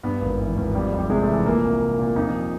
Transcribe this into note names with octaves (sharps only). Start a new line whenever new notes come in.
G2 B3
G#1
E3
G#1
F2 G3
G3
F1
G3
C3 G#3
A3
E3
A3
A#2 A#3
C2
C2
A#2
F2 D#4